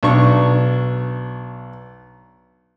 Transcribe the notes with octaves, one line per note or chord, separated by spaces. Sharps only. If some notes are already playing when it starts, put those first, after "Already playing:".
B1 D4 C#6